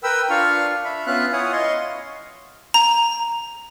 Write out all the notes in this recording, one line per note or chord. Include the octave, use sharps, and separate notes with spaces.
A#4 B4 G5 B5 E6
D4 F4 F5 C#6 F6
E5 B5
B3 C#4 F4 E5 F5 F#6
E4 F4 C#5 F#5 G#5 D#6
D#5 F5 C6 C#6
A#5